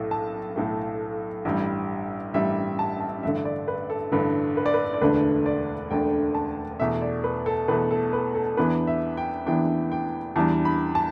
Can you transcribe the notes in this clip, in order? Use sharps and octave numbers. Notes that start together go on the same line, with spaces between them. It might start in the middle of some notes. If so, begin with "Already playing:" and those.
Already playing: B1 A2 A3
A5
B1 A2 A3
A1 G2 G3
A1 G2 G3 E5
A5
A5
A1 G2 D3 E5
D5
B4
A4
A1 G2 D3 B4
B4
D5
B4
D5
E1 D2 D3 A3 D4 B4
D5
E1 D2 D3 A3 D4 G5
A5
E2 B2 A3 E5
D5
B4
A4
E2 B2 A3 B4
A4
B4
A4
E2 E3 B3 D4 B4
E5
G5
E2 E3 B3 D4 G5
G5
E2 E3 G3 D4 A5
B5
A5